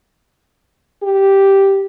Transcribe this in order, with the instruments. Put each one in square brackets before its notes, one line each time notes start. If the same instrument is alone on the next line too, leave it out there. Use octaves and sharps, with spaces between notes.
[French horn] G4